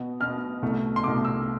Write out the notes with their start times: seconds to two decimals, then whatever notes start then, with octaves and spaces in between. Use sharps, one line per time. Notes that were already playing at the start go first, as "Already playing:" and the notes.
Already playing: B2 B3
0.20 B2 B3 F6
0.62 C2 B2 A3
0.96 C6
1.04 C2 B2 A3 D6
1.25 E6